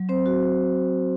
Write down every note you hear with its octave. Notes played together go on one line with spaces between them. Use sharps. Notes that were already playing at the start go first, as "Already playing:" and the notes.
Already playing: F#3
C4 C5
F#4
C4